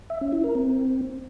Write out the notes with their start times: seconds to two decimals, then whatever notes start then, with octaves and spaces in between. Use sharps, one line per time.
0.10 E5
0.21 C#4
0.33 E4
0.44 A#4
0.55 C4